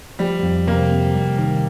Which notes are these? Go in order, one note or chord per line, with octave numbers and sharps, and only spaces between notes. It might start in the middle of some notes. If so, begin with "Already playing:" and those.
F3 G3
F2
C3 A#3
C3
G3
D#3